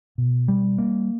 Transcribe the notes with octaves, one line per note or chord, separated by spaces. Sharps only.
B2
G3
A#3